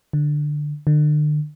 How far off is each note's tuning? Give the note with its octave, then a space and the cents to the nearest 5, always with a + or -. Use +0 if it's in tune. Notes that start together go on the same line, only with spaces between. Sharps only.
D3 +10
D3 +35